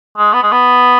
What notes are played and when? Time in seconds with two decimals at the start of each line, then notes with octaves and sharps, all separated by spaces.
0.18 G#3
0.33 B3
0.43 G#3
0.52 B3